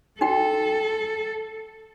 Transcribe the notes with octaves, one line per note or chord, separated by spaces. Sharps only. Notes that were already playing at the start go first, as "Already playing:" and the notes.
D#4 F#4 A4 G5